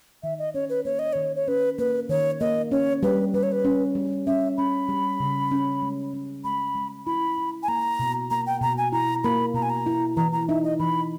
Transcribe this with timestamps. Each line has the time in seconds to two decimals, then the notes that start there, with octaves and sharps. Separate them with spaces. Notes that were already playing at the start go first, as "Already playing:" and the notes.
0.23 D#3 E5
0.39 D#5
0.54 C#4 C#5
0.69 B4
0.85 A#3 C#5
0.99 D#5
1.13 D#3 C#5
1.35 C#5
1.48 C#4 B4
1.78 A#3 B4
2.09 D#3 C#5
2.40 A#3 D#5
2.71 C#4 C#5
3.03 G3 B4
3.34 G3 B4
3.43 C#5
3.52 B4
3.65 C#4
3.95 G3
4.27 C#4 E5
4.58 C#4 B5
4.89 G3
5.20 C#3
5.51 C#4
5.82 G#3
6.13 C#4
6.44 G#3 B5
6.75 G#3
7.06 E4 B5
7.38 E4
7.63 G#5
7.68 A#3 A#5
7.99 B2
8.31 A#3 A#5
8.46 G5
8.61 B2 A#5
8.78 G#5
8.92 E4 A#5
9.24 A#3 B5
9.54 B2 A#5
9.62 G#5
9.70 A#5
9.86 E4
10.17 E3 A#5
10.32 A#5
10.48 D#4 E5
10.63 D#5
10.79 E3 B5